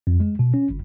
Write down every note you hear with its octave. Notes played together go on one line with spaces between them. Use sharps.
F2
G#3
B2
C#4
G1